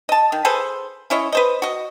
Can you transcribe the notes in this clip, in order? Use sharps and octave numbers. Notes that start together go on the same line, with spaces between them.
D#5 A5
D#3
G#4 A4 B4 C5
C#4 E4 C#5 D#5
B4 C5 D#5
F#4 D#5